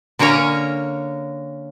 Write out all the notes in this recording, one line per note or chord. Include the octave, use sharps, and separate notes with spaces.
D3 A#3 C#4 C#5 A#5